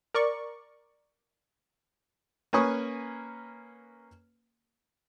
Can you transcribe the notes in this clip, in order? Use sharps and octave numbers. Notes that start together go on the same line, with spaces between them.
A#4 D5 C#6
A#3 C#4 B4 G#5 C#6 D#6